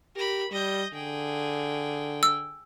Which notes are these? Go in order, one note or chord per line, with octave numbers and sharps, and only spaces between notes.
G4 A#4 B5
G3 D#5 G6
D3 G#4 G5
E6